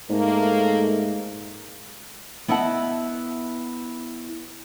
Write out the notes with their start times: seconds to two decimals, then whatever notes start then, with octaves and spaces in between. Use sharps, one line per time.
0.10 G#2 A3 A#3
2.48 B3 E4 D#5 E5 F#5 A5